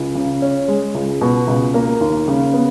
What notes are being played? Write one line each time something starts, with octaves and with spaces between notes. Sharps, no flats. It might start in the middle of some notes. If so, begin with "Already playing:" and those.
Already playing: C#2
C#3
C#4
G#3
C#2
B2
C#2
A#3
D#2
C#3
B3